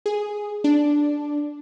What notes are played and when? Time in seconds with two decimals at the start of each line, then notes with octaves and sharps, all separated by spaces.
0.06 G#4
0.64 D4